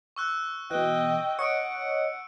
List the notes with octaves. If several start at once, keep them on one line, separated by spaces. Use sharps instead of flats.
C#6 E6 F#6
B2 E3 D#5 G5 F#6
C#5 D#5 F#5 C#6 C#7 D7